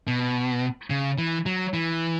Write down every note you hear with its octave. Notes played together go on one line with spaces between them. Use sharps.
B2
C#3
E3
F#3
E3